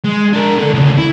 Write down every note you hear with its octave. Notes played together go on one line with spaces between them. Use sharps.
G#3
D4 A#4
D3 A4
D2 C#3
E4